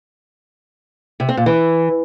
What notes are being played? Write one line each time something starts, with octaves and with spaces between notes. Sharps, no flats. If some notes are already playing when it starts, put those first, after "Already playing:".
C3
C4
A#2
E3